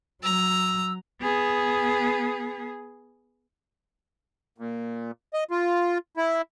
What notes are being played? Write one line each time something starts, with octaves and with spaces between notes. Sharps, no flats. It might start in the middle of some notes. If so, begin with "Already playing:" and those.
F#3 A#5 E6
B3 G#4
A#2
D#5
F4
E4